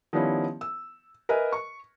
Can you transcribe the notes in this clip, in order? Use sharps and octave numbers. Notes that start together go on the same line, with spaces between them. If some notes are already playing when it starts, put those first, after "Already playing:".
D#3 F3 G3 B3 C#4 E4
E6
A#4 B4 D#5 E5 G#5
C#6